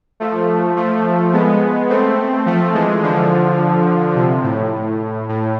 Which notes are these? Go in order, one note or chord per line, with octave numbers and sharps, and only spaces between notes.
F3 A3
F3 A3
G#3 B3
A3 C4
F3 A3
E3 G#3
D3 F3
C3
A2
A2